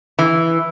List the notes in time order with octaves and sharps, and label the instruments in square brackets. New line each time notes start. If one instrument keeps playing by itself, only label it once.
[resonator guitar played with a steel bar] E3